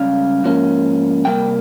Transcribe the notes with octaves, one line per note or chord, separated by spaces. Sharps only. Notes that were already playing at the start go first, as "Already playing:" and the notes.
Already playing: C#2 G3 C#4 F5
G#2 F3 A#3 C#4
C2 C3 G3 A#3 G5